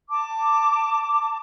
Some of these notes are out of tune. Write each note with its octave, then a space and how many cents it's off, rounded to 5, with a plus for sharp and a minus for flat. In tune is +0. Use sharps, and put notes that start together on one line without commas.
A5 +20 D6 +5